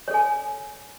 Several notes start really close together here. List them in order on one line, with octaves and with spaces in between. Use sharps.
C#5 A4 G#5